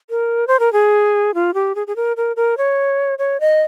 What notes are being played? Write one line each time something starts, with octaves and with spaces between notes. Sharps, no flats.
A#4
C5
A#4
G#4
F4
G4
G#4
G#4
A#4
A#4
A#4
C#5
C#5
D#5